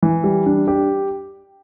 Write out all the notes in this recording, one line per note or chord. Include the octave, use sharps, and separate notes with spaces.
E3
G3
D4
G4